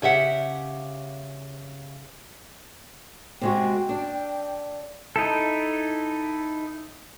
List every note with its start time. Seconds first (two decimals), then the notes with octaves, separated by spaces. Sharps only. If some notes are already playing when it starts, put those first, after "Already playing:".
0.02 C#3 G4 E5 F#5
3.41 C3 G#3 F#4 G5
3.89 D4
5.16 D#4 E4 A4